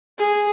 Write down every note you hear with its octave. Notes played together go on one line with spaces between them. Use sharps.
G#4